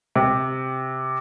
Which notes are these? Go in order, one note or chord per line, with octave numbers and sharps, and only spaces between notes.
C3